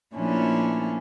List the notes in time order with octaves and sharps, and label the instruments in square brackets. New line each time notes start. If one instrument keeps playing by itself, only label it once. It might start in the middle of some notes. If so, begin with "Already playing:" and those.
[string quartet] A#2 F3 A3 C#4 D4 E4